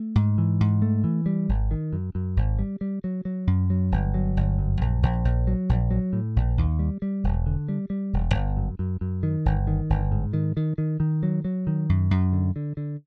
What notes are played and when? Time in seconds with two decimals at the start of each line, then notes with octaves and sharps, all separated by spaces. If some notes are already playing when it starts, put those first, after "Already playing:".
Already playing: A3
0.15 G#2
0.38 E3
0.60 G#2
0.82 A3
1.04 E3
1.26 G3
1.49 G#1
1.71 D#3
1.93 F#2
2.15 F#2
2.36 G#1
2.59 G3
2.81 G3
3.04 F#3
3.25 F#3
3.47 F#2
3.70 F#3
3.92 G1
4.14 F#3
4.37 G1
4.58 F#2
4.81 A#1
5.03 A#1
5.25 A#1
5.47 F#3
5.69 A#1
5.91 F#3
6.13 A2
6.36 A#1
6.57 D#2
6.79 G3
7.02 G3
7.24 E1
7.46 D3
7.68 G3
7.90 G3
8.13 E1
8.34 G1
8.57 F#2
8.79 F#2
9.01 F#2
9.23 D#3
9.46 G1
9.67 D#3
9.90 G1
10.11 G#2
10.33 D#3
10.57 D#3
10.78 D#3
11.00 D#3
11.23 F#3
11.45 F#3
11.67 D#3
11.89 F#2
12.11 F#2
12.33 D3
12.56 D3
12.77 D3